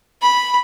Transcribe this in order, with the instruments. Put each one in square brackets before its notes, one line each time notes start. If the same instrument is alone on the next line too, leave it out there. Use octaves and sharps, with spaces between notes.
[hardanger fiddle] B5